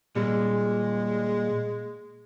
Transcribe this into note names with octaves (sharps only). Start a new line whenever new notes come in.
A#2 G3 G#3